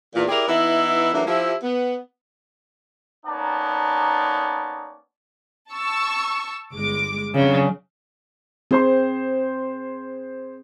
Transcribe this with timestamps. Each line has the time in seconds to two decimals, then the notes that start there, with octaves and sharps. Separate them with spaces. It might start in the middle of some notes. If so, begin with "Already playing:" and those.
0.14 E2 A#2 E3
0.28 E4 G4 G#4 A#4 D5 D#5
0.47 E3 B3 D#4 E4
1.13 E3 F#3 A3 A#3 D4 D#4
1.27 F3 E4 G4
1.63 B3
3.26 A#3 B3 C#4 D#4 D5 A5
5.72 A5 C#6 E6
6.73 G1 G#3 D6
7.35 F2 C#3 F#3 D4
8.71 C4 G#4 C5 C6